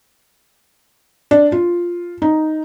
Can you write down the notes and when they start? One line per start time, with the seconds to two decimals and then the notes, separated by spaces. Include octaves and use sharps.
1.31 D4
1.52 F4
2.22 D#4